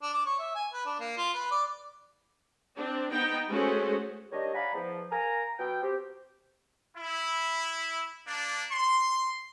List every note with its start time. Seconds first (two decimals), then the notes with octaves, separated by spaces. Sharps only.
0.02 D4
0.14 D6
0.26 C#5
0.39 E5
0.55 G#5
0.73 B4
0.86 D4
1.00 A#3
1.17 F4
1.34 B4
1.51 D5
2.76 C4 D4
3.11 B3 D#4 G5
3.48 G#3 A3 C#4 F#4 G#4 C5
4.32 D#3 G3 D4 C#5 D#5
4.55 D5 F5 F#5 G#5 A#5 B5
4.74 E2 F3
5.11 A#4 F5 G#5 A#5
5.59 B2 F#3 B3 G5
5.83 C4 G4
6.96 E4
8.26 A#3 D4
8.71 C6